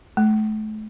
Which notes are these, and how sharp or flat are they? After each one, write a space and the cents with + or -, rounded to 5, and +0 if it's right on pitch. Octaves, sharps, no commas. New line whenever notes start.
A3 -35